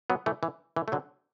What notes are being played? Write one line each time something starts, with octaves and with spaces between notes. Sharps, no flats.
F#3 B3
E3 A3
E3
E3
A3
D3 F#3